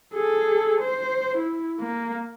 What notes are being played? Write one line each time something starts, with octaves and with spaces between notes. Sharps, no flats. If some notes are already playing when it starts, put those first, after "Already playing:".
G#4 A4
C5
E4
A#3